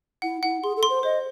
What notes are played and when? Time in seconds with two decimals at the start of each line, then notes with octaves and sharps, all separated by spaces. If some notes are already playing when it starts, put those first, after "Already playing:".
0.22 E4 F#5
0.43 E4 F#5
0.63 G#4 C6
0.76 A4
0.83 C6
0.89 C5
1.03 C5 D#5